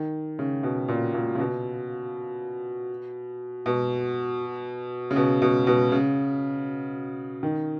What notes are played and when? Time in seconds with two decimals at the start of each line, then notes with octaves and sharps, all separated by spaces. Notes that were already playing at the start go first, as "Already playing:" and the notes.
Already playing: D#3
0.39 C#3
0.63 B2
0.88 A#2
1.14 A#2
1.35 C#3
1.39 B2
3.66 B2
5.11 C#3
5.16 B2
5.42 B2
5.67 B2
5.92 C#3
7.43 D#3